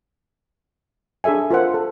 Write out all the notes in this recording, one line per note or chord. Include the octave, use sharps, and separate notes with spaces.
D4 G#4 A4 E5 G#5
F4 A#4 C5 F#5
A4